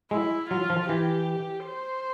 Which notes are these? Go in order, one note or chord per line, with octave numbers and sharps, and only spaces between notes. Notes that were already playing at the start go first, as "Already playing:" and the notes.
G#3 E4
F#3 F4
F3
E3 G4
C5